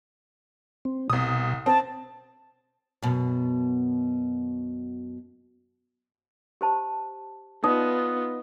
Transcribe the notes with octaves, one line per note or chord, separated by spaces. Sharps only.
C4
C2 B2 D#6
C4 A5
F#2 B2
G4 C5 A5
B3 D#4 F4 D#5